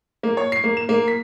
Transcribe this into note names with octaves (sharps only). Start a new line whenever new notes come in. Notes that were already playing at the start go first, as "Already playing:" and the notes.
A#3
C#5
C7
A#3
E7
A#3
B6